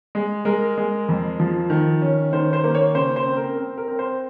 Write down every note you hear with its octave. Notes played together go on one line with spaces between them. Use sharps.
G#3
G#3 A#4
G#3
F2
F3
D#3
C#4
D#3 C5
C5
A#3
C#5
C#3 C5
C5
C4
A#4
C4
A#4
C4
C5